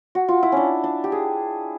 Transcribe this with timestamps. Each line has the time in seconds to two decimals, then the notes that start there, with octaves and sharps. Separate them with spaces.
0.15 F#4
0.28 F4
0.43 E4
0.52 C#4 D4
0.84 D4
1.04 G4
1.12 G#4